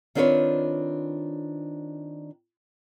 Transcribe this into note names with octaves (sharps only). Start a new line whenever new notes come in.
D#3 C4 D4 F4 B4 C#5